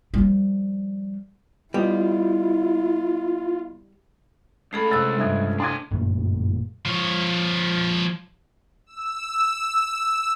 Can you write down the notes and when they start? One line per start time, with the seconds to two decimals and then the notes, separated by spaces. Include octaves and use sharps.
0.14 F3 G3
1.74 G3 B3 E4 F4 D#5
4.73 C#2 A3 G#4 A4 B5
4.91 C3 E6 F#6 A6
5.17 G2 E5 G#6
5.60 D4 G#5 C6 D6 G#6
5.91 G1 F#2 A#2 A3
6.85 F3 C#5
8.86 E6